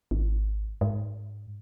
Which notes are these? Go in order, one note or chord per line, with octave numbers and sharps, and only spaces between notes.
G#1
G#2